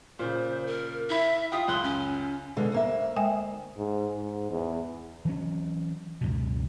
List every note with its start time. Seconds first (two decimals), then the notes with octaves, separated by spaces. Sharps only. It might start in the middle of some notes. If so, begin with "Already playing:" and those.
0.19 A#2 C#3 C5
0.66 A#4
1.10 E4 E5 B5
1.52 F4 F5 G5 D#6
1.68 C#2 F#2 C6 F#6
1.84 C#4
2.56 B2 D3 G#3
2.72 D2 A#3 E5
3.16 G#3 G5 G#5
3.77 G#2
4.13 G#2
4.50 E2
5.25 E3 F#3 C#4
6.21 C#2 F#2 B2